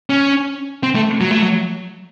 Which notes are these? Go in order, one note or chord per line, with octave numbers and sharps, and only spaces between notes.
C#4
C4
A3
F#3
A3
F#3